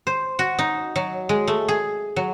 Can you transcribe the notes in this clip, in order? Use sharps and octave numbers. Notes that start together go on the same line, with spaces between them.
C5
F#4
D#4
F#3
G#3
A3
G#4
F#3